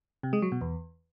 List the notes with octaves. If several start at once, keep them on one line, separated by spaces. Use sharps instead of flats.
C3
G#3
F#3
B2
E2